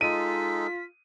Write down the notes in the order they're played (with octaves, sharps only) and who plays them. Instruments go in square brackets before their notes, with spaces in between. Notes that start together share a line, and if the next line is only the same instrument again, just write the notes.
[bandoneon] G#3 D#4 A4 [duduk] F4 [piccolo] B6 [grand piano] D#7